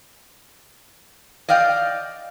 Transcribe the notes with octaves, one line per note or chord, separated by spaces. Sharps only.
D5 D#5 F5 G5